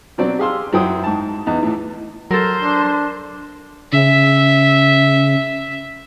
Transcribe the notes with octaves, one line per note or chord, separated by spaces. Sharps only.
B2 F#3 C4 D5
G4 G#4 F5 C6 E6
F#2 F#3 E4 C5 G5 D#6
G#2 A5
E2 B3 D#4
A2 E3
F#3 A4 A#4 C5
D4
C#3 E5